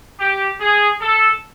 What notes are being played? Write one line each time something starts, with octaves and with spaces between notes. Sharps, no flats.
G4
G#4
A4